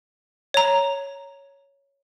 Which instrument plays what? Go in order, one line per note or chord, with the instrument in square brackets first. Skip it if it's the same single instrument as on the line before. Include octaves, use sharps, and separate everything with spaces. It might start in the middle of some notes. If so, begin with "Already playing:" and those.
[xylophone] C#5 A#5